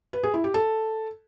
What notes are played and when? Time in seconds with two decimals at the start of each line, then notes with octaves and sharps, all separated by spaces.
0.13 B4
0.23 G#4
0.34 E4
0.44 G4
0.54 A4